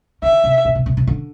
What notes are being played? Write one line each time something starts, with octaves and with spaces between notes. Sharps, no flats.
D3 E5
C3
B2
C3
C3
C3
D3